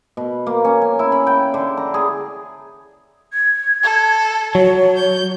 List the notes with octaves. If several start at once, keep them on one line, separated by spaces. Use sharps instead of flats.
B2
A#3
C#4
G#5
E4
B5
G5
D3
A#5
G#4
G#6
A4
F#3 C#5
G6